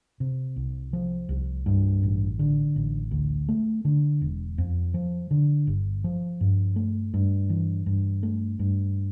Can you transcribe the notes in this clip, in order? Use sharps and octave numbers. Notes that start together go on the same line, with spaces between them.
C3
C2
F3
C2
G2
A1
D3
A1
D2
A3
D3
E1
F2
F3
D3
G1
F3
G2
A3
G2
E3
G2
A3
G2